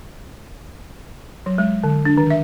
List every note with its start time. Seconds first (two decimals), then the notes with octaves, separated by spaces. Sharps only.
1.46 F#3
1.58 G#3
1.84 D3
2.05 D4
2.18 D#3
2.30 E5